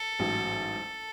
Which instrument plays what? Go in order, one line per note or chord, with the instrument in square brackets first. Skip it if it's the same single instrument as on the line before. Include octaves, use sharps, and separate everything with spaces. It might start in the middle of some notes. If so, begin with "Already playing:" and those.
Already playing: [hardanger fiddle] A4
[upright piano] A1 G#2 F#3